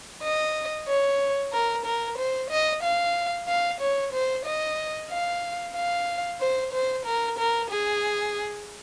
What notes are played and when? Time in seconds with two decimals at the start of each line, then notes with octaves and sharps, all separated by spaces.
0.23 D#5
0.88 C#5
1.53 A#4
1.85 A#4
2.18 C5
2.50 D#5
2.83 F5
3.48 F5
3.81 C#5
4.13 C5
4.45 D#5
5.11 F5
5.76 F5
6.40 C5
6.73 C5
7.06 A#4
7.38 A#4
7.70 G#4